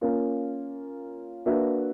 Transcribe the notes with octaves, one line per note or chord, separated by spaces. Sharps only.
A#3 C#4 F4 A#4
A#3 D4 F#4 B4 E5